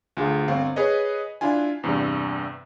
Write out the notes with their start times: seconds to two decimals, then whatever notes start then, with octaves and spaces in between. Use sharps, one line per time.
0.17 D2 F4 G#4
0.48 G1 C4 F5
0.76 G#4 B4 C#5 D#5
1.41 D4 E4 F4 G#5
1.84 E2 G2 C3